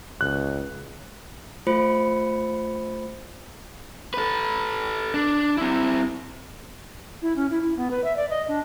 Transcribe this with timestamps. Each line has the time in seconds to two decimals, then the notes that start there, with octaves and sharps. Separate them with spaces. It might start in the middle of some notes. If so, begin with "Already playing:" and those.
0.21 C#2 F#6
1.67 A3 F4 C5 B5 C#7
4.14 A4 B4
5.14 D4
5.58 C4 E4
7.22 E4
7.36 C#4
7.50 E4
7.62 E4
7.77 B3
7.91 B4
8.04 E5
8.16 D5
8.30 D#5
8.48 D4